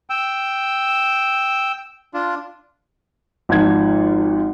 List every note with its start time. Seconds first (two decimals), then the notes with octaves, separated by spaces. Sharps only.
0.10 G5 E6
2.14 D4 F4
3.49 G#1 F3 D#4 F4 F#5 G#6